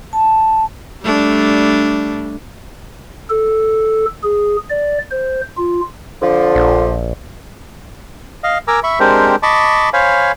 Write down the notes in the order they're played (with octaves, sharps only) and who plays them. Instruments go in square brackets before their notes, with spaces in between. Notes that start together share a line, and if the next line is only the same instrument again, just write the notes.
[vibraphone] A5
[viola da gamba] G3 A3 D4
[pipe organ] A4
G#4
D5
C5
F4
[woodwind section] D3 F3
[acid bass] A#1
[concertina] D#5 F5
A#4 G#5 A#5 D6 E6
E5 B5 C#6
G#3 C4 D4 G4 A#4 C5
D#5 A5 B5 C#6 D6
C5 C#5 F5 G#5 B5